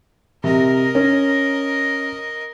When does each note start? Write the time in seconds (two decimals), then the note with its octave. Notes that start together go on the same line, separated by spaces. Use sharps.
0.44 C3 A#4 D#5
0.95 C#4